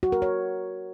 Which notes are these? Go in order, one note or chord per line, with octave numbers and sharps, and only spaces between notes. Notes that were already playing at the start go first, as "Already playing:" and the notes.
F#4
A#4
C#5